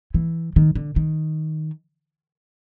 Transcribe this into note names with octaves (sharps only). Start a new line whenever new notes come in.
E3
D#3
D3
D#3